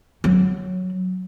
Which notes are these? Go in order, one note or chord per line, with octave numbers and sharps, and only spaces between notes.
F#3